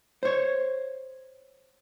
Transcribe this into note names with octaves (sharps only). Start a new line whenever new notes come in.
C5 C#5